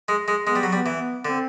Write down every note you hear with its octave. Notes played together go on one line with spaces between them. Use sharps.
G#3
G#3
G#3 B3
G3
F#3
G3 B3
E3
B3
D3 C4